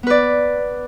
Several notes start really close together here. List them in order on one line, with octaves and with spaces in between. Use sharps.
B3 B4 D5